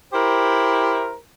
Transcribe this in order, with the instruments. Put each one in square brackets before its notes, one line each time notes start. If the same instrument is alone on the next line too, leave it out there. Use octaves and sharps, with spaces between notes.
[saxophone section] E4 G4 A#4 C5